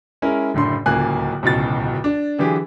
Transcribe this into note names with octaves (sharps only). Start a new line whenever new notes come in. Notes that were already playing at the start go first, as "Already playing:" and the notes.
G#3 C#4 E4 A#4
F#1 A2 D3 C6
D1 C#2 A#3 G#5 F#6
D1 C#2 B2 A6
D4
D3 E3 F#3 G4 G#4